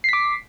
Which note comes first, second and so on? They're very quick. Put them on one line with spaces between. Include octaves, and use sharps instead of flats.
C7 B6 D6